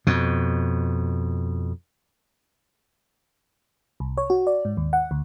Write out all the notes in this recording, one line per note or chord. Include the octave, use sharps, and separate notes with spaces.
F2 B2
C2
C#5
F#4
D5
G#2
D#2
F#5
D2